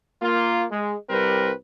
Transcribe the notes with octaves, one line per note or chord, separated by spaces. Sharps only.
A#3 F4
G#3
C2 G3 C4 A#4 B4